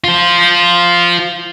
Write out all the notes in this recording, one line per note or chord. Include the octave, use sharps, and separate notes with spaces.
F4 C5